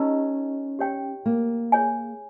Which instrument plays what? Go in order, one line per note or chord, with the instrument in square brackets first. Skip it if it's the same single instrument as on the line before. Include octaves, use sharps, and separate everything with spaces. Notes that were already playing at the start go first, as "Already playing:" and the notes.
Already playing: [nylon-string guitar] C#4 [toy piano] D#4 G4 A#4 D#5 A#5
[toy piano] G4 C#5 G5
[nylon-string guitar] A#3
[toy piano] G#4 C#5 G#5